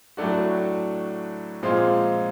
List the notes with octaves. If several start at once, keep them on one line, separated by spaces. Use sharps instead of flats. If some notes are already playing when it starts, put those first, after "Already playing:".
A2 F#3 A3 D4 F#4
A#2 F3 G#3 C4 F4